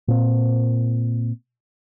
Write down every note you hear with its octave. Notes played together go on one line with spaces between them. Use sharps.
A#2 C4